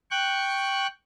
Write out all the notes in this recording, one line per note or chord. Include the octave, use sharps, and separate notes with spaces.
G5 C#6 F#6